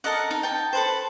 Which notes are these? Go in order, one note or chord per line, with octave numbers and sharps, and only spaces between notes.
A4 A#4 D#5 F#5
D#4
G5 A5
A4 B4 C5